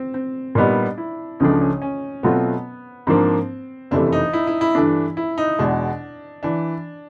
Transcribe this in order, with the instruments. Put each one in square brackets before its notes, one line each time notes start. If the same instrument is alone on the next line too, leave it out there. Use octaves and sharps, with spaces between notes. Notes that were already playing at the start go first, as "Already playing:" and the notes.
Already playing: [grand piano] C4
C4
[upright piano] A#2 G3 B3 D#4 [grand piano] D4
[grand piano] E4
[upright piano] C#2 C#3 F3 A3 D4 [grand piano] D#4
[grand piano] C#4
C#4
[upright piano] B2 F#3 A3 C4 F4 [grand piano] B3
[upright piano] G#2 F3 A#3 D4 [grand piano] C4
[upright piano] F#1 F2 C3 E3 A3 [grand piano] D4
[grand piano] D#4
E4
E4
E4
[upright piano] G2 E3 A3 D4
[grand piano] E4
D#4
[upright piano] E2 B2 G#3 [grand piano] D4
[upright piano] E3 [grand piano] D4